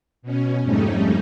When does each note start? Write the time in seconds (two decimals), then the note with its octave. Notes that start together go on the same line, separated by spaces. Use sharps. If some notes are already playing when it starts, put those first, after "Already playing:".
0.22 B2 C#4
0.62 F2 G#2 G3 A3 C#4 D#4